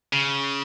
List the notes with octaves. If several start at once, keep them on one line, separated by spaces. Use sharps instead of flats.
C#3